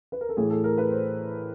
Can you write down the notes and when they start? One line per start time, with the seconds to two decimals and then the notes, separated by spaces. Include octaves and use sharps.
0.12 B4
0.21 A#4
0.29 A4
0.37 A2 E3 G#4
0.50 A4
0.64 A#4
0.78 B4
0.91 C5